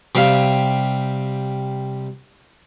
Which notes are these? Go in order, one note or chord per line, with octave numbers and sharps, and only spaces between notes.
C3 G3 E5 F5